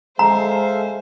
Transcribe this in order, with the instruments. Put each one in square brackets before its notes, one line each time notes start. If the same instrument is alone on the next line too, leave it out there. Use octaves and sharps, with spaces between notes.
[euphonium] G#3 [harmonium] A4 E5 F5 [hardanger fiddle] C5 [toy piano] A#5